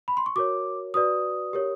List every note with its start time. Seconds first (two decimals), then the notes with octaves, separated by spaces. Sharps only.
0.08 B5
0.17 C6
0.26 C#6
0.36 F#4 A#4 C#5 D6
0.94 F#4 B4 D5 D#6
1.53 G4 A#4 C#5